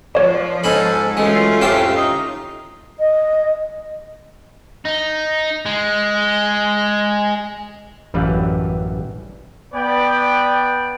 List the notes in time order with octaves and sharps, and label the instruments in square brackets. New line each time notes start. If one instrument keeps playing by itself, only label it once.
[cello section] F3 [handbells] C#5 D5
[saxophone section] G#2 A4 [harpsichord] C#4 D#5 B5
[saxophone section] F#2 E3 A3 [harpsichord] G#3 [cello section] C#4 F4
[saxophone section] F2 A2 [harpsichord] G4 A#4 E5
[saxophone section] D#4
[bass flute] D#5
[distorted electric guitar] D#4
G#3
[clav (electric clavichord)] A1 F#2 E3 G3 B4 F5
[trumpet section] B3 B4 D5 G5